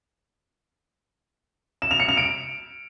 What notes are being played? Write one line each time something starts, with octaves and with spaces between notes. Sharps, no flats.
E7
F7
C#7
F7
D7